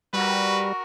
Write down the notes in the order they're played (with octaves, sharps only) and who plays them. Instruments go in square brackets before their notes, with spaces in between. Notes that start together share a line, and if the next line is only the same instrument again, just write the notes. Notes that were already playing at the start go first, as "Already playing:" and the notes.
[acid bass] G3 [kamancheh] F#4 A#4 [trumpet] B4 [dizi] C#6